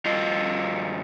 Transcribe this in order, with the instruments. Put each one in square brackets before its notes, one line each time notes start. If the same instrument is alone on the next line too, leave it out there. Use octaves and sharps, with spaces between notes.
[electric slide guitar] G2 F4 D#5